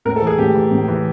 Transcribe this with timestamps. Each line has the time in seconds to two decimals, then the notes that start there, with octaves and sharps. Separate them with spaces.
0.05 A2 A#4
0.16 A4
0.22 E3 G#4
0.38 A2 G4
0.55 E3
0.71 A2
0.88 E3